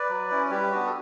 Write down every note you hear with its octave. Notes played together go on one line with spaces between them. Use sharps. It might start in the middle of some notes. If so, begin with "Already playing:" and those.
Already playing: B4 D5
F#3
C#4 E4
G3 G4 B4
B3 D4 F#4
A4